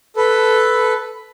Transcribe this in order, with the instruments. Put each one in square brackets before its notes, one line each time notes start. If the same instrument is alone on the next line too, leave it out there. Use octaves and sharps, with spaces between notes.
[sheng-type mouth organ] A4 B4